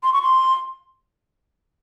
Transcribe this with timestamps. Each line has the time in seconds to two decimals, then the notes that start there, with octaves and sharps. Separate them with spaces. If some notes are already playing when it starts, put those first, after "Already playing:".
0.03 C6
0.13 C#6
0.22 C6